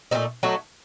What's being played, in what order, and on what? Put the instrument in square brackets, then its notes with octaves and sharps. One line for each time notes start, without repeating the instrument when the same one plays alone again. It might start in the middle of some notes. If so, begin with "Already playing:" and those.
[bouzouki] A#2 A3 C4 D#4
F#3 A3 D#4 F#4